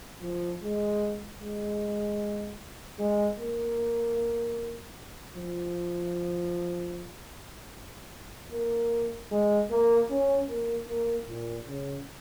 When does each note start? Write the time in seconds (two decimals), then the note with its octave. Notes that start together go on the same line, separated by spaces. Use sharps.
0.23 F3
0.63 G#3
1.42 G#3
2.99 G#3
3.39 A#3
5.36 F3
8.52 A#3
9.32 G#3
9.70 A#3
10.10 C#4
10.49 A#3
10.88 A#3
11.29 A#2
11.67 C#3